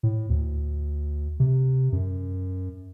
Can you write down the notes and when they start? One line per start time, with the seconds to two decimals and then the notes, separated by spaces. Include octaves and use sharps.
0.03 A2
0.29 D2
1.40 C3
1.92 F#2